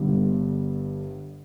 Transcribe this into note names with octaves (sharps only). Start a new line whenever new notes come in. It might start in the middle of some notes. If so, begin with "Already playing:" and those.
Already playing: G1 G2 D3